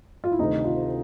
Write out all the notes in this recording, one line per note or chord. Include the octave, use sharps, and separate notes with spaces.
F4
E4
D2 C3 D#3 D#4
F4